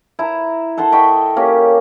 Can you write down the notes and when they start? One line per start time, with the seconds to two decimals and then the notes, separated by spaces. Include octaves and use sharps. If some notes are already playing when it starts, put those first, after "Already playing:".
0.19 E4 A#5
0.77 A4 F#5 A5 C6
0.92 D#5 G5 B5 C#6
1.36 A#3 C#4 G4